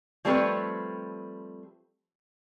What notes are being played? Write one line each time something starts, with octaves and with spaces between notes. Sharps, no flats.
F3 G3 A3 C4 B4 C#5